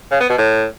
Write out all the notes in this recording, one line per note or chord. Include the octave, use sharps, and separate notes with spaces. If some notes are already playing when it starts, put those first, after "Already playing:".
C#3
B3
B2
A2